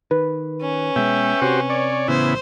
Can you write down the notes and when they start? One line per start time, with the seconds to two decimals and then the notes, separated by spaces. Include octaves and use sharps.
0.11 D#3 B4
0.62 C#4
0.96 B2 G#3 E5 G5
1.42 C3 F#4 G4 C5
1.70 C#5 D5
2.08 A1 C#3 B3 E4 C5